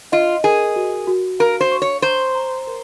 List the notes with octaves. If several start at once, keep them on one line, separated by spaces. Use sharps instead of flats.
F4 D#5
G#4 A#4
F#4
F#4
A#4 F5
C5
C#6
C#5
C5 A#5
A#5
A#4